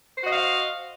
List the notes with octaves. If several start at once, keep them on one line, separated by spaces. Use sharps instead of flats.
F#4 C5 D#5 F5